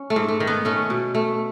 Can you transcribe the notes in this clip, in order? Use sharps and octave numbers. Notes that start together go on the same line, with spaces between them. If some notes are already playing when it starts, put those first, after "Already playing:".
Already playing: C#4
A3
G#2
A3
D#3
B3
A3 C#4
B2
A3